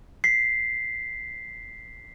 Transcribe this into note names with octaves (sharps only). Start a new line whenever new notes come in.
B6 C7